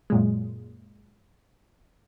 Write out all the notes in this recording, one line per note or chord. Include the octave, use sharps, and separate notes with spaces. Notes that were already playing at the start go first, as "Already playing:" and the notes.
F#2 A#2 G#3